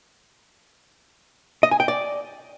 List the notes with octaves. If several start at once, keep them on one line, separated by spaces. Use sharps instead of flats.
D#5
G#5
G5
D5